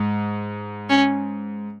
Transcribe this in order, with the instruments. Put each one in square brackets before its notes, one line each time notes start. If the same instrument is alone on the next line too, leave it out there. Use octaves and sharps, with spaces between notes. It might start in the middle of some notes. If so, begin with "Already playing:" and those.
Already playing: [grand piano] G#2
[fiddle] C#4